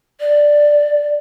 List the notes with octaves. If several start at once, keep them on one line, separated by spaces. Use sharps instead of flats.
D5